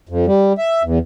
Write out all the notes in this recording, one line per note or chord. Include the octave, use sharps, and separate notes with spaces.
F2
G3
E5
E2